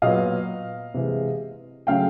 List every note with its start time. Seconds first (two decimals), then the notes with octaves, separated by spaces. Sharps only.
0.02 A#2 F#3 B3 D#5 F5
0.94 C3 E3 G#3
1.87 C#3 F#3 A3 F5 G5